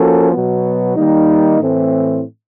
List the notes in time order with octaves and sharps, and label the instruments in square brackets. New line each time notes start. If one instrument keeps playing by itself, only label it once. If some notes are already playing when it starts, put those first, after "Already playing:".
Already playing: [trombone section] F3 A#3 C#4 F#4 A4
B2 F#3 B3
D#3 G3 A#3 D#4
A2 E3 A3 C4